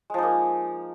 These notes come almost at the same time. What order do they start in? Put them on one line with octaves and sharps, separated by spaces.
G#3 F3 D#4 A#3